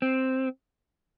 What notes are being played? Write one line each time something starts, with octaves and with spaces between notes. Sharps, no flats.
C4